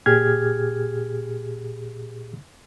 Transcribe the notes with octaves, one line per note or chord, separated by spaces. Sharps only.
A#2 G4 G#4 F6 G#6